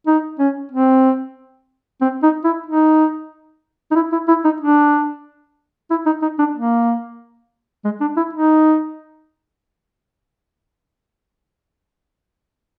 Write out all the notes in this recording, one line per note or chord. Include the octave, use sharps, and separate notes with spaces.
D#4
C#4
C4
C4
D#4
E4
D#4
D#4
E4
E4
E4
D#4
D4
E4
D#4
D#4
D4
A#3
G#3
D4
E4
D#4